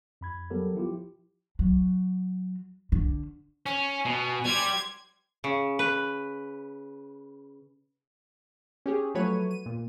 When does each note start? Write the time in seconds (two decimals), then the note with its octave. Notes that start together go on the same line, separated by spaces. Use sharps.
0.21 F2 B5 G#6
0.50 F#3 G3 B3 G4 A4 A#4
0.75 F3 E4 F4 G4
1.59 F#3
2.92 D3
3.66 C#4 G#5
4.05 B2
4.45 G3 G4 C6 G#6
5.44 C#3
5.79 B4
8.86 C#4 G4 G#4
9.15 F3 F#3 A3 B4 C#5 D#7
9.51 D#7
9.66 A#2